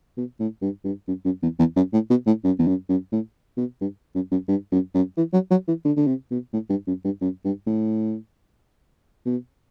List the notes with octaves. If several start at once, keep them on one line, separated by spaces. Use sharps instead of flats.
B2
A2
G2
G2
F#2
F#2
E2
E2
F#2
A2
B2
A2
F#2
E2
F#2
F#2
A2
B2
G2
F#2
F#2
G2
F#2
F#2
E3
F#3
F#3
E3
D3
D3
C3
B2
A2
G2
F#2
G2
F#2
G2
A2
B2